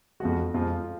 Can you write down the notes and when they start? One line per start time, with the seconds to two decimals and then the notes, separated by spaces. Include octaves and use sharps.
0.20 F2 F3 G#3 F#4
0.54 F2 F3 G#3 F4